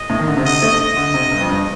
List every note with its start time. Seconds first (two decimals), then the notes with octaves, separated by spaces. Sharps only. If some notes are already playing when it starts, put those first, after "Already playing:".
Already playing: D#5
0.10 A2
0.19 D#3
0.27 D3
0.37 C3
0.45 D3 D#5
0.62 A3
0.80 D#5
0.97 D3
1.14 C3
1.32 G2
1.41 F2
1.49 G2